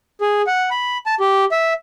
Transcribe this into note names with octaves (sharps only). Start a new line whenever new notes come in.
G#4
F#5
B5
A5
G4
E5